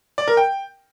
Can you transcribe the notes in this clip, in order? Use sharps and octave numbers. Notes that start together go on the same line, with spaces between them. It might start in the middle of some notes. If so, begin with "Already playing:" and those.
D5
A#4
G5